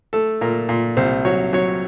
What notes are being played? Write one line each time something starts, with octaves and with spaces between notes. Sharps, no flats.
A3 A4
A#2 A#4
A#2
C2 C5
F#3 C#5
F#3 C#5